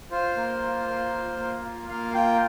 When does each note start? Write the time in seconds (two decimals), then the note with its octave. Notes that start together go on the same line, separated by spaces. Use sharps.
0.11 F4 C5
0.36 A#3
0.62 F4
0.87 A#3
1.14 F4
1.39 A#3
1.64 F4
1.89 A#3 F5
2.14 F4 G5